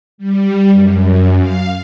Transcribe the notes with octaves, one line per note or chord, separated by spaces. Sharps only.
G3
F#2
F5